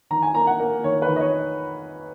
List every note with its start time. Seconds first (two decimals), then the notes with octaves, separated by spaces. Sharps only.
0.10 D#3 A#5
0.23 G#5
0.35 A#3 A#5
0.47 F#5
0.60 A#3
0.84 D#3 C#5
1.02 B4
1.08 D#3
1.16 D#5
1.21 C#5